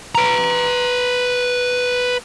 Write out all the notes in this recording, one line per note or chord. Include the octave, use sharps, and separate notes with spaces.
B4 A#5